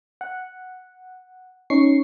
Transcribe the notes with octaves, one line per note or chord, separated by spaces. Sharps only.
F#5
C#4 D#4 C#6 C7